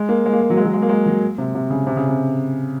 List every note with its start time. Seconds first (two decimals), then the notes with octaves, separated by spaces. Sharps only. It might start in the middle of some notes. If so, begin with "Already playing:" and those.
Already playing: G#3
0.09 A#3
0.26 G#3
0.33 A#3
0.41 G#3
0.50 F#3
0.57 G#3
0.65 F#3
0.74 G#3
0.82 A#3
0.89 G#3
1.06 F#3
1.38 C3
1.55 C3
1.70 C#3
1.87 C3
1.96 C#3
2.08 C3